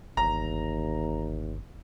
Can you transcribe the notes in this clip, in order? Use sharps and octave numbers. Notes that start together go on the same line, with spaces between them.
G1 D#2 A#5